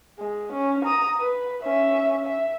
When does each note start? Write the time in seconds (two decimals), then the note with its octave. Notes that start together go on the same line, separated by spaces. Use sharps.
0.19 G#3
0.53 C#4
0.85 A#5 D#6
1.19 B4
1.63 C#4 E5
2.26 E5